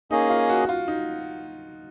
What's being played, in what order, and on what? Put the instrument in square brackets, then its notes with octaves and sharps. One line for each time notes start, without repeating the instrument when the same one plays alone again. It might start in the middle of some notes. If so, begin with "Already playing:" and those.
[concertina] A#3 C#4 G#4 D#5 [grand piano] D#4
[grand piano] F4
F#4
F4
D#4